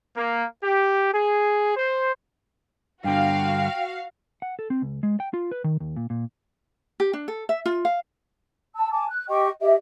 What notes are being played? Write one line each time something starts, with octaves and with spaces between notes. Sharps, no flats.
A#3
G4
G#4
C5
G2 D3 F#4 F5 G5
F#5
A4
C4
C#2
G#3
G5
F4
B4
D#3
D#2
A#2
A#2
G4
D4
A4
E5
F4
F5
A5 E6
G#5 A5 D6
F#6
G4 D#5 G5 C#6
G4 D#5 E5